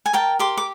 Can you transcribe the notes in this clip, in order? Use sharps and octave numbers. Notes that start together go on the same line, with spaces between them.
G#5
A#4 G5 A5
G4 C6 D6
D6